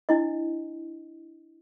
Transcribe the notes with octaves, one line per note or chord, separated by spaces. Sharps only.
D4 E4 D#5